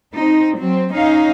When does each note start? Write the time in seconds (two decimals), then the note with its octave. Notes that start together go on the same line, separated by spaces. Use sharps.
0.15 C4 D#4
0.57 F#3 C4
0.92 C#4 D#4 F5